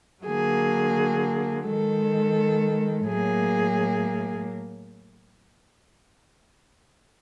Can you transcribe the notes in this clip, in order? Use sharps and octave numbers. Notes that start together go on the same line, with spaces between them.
D3 F#3 A#3 G#4
D#3 G#3 A4
A2 F#3 A#3 G#4